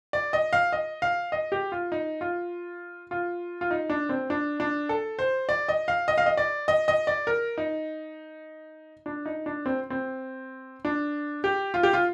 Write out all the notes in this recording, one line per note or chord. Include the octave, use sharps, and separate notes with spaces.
D5
D#5
F5
D#5
F5
D#5
G4
F4
D#4
F4
F4
F4
D#4
D4
C4
D4
D4
A4
C5
D5
D#5
F5
D#5
F5
D#5
D5
D#5
D#5
D5
A#4
D#4
D4
D#4
D4
C4
C4
D4
G4
F4
G4
F4